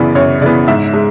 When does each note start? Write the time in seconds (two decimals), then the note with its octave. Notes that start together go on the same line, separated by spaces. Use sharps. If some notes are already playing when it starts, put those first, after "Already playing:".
Already playing: F#2 C#3 E3 B3 D5
0.15 F#2 C#5
0.42 C#3 E3 B3 D5
0.68 G#2 E5
0.93 G#3